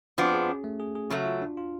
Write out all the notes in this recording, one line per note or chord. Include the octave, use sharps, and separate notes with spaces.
F2 F3 B3 D4 F#4
G#4
C#4
A3
G#4
G#4
C#3 F#3 A3 F#4
F4
D4
F4